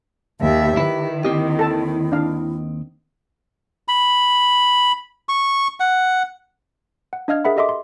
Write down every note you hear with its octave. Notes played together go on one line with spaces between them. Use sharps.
D#2 G4 E5
D#3 E4 B4
D#2 C4 E4 G4 D#5
A4 A5
D4 F5
B5
C#6
F#5
F#5
D4 D#5 F5 F6 G#6
G#4 A#4 E5 F#5 B5
G4 A4 D#5 E5 C6 D6
C6